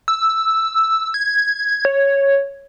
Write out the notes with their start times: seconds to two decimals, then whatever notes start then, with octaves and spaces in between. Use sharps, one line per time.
0.08 E6
1.14 G#6
1.85 C#5